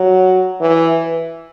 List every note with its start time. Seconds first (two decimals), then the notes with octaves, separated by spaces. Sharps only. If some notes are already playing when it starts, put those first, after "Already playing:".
Already playing: F#3
0.61 E3